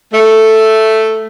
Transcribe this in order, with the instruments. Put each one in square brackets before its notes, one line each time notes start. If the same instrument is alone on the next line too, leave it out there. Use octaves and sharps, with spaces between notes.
[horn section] A3